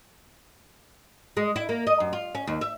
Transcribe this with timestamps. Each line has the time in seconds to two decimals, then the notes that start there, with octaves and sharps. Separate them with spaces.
1.37 G#3
1.56 E4
1.69 A#3
1.87 D#5
2.00 F#2
2.13 F4
2.35 C#4
2.47 D#2
2.61 E5